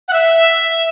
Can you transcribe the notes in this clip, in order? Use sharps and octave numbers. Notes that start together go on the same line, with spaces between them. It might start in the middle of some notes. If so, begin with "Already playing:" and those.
F#5
E5